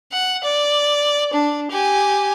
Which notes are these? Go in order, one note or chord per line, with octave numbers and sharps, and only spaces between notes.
F#5
D5
D4
G4 G#5